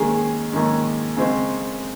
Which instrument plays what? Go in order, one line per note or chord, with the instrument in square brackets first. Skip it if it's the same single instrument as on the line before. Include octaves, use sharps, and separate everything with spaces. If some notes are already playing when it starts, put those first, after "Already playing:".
Already playing: [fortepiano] D#2 D#3 G#3 C#4 [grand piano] G#4
[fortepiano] D#2 D#3 G#3 C#4
C#3 G#3 C4